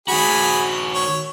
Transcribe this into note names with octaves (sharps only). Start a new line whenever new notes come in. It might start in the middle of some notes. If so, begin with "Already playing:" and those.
D#3 F#4 G#4 B5
C#5